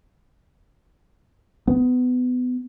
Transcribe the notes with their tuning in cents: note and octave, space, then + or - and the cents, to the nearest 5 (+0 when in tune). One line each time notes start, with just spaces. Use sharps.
B3 +20